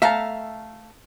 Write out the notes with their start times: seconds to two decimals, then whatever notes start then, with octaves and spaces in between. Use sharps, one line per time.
0.02 A3 E5 F5 A5 A#5